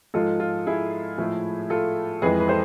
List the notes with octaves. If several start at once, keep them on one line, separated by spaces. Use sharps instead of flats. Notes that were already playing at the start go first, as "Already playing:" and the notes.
G#2 F3 G#3 F4 A4
F4
E4 G#4
A2 F3 A3
F4 A4
F2 E3 G#3 G#4 B4
B4
A4 C5